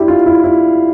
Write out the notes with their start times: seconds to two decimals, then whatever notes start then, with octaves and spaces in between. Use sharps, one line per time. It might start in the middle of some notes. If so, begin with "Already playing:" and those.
Already playing: D4 E4 G4
0.08 F4
0.26 E4
0.44 E4